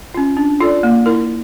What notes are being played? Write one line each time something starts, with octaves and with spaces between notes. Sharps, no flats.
C#4 F4
D4
F4 A4 D5
A#3
E4 A#4